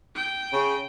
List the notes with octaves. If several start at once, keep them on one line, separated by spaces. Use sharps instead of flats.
G5
C#3